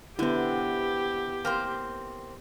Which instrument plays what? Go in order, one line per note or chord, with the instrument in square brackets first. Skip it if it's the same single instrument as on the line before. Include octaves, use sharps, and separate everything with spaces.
[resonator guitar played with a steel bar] D3 C4 [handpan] B3 E4 [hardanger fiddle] G4
[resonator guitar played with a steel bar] A#3 C4 C5